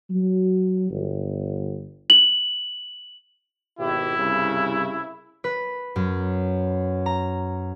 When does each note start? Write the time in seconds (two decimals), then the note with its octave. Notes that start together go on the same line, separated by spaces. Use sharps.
0.10 F#3
0.90 G1
2.10 F#7
3.79 G#1 B2 E4 G4
4.18 C2 G2 C#3
5.44 B4
5.96 F#2
7.06 A#5